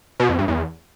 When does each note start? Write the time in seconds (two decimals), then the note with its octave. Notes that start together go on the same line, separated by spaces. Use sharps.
0.20 B2
0.29 F2
0.38 G2
0.48 E2